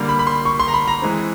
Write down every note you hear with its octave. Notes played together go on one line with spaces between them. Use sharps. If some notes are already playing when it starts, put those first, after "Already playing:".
Already playing: D3 G3 A#3
B5
B5
C6
C#6
C6
A#5
B5
A#5
E3 G#3 C4